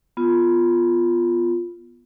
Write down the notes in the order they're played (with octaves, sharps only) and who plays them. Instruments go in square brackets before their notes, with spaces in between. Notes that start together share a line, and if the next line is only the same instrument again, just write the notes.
[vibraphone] B3 F4